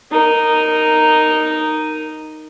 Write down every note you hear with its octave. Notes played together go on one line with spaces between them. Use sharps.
D#4 A#4